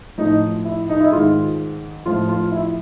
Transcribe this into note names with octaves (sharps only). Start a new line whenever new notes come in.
A2 F3 D#4
E4
D#4
E4
G#2 D#3 F4
A2 F3 F4
F4
E4